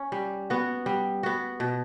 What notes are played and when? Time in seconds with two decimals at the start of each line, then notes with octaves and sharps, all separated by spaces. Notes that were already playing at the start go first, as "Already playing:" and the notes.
Already playing: C#4
0.12 G3
0.50 B3 F#4
0.86 G3
1.23 B3 F#4
1.60 B2